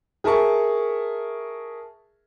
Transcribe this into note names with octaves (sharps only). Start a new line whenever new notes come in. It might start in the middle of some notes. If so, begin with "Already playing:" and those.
G#4 A#4 E5 A5 C#6